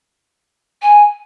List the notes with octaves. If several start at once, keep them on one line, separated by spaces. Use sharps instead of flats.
G#5